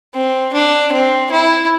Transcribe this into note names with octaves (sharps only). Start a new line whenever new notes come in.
C4
D4
C4
E4